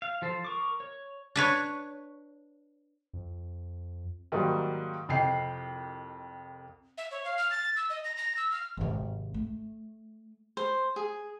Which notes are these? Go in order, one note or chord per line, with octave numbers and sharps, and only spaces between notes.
F5
F3 A4 C5
A#4 C#6 D6
C#5
D4 B4 C#5
F2
G#2 D#3 F#3 G3 A#3
C2 F2 D#5 G5 C7
E5
C#5
F5
F6
A6
E6
D#5
A#6
A#6
E6
F6
G#1 C3
A3
C5
G#4